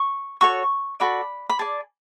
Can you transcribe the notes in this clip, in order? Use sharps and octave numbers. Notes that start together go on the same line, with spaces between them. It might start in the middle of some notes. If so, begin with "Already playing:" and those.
Already playing: C#6
F#4 A4 C#5 C#6
F#4 A4 D5 B5
B5
G#4 D5 A5